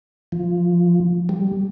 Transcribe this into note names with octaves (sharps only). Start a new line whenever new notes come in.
F3
G3